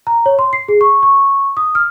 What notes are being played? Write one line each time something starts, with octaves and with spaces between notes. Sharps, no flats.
A#5
C#5
C6
C7
G#4
C#6
C#6
D#6
F6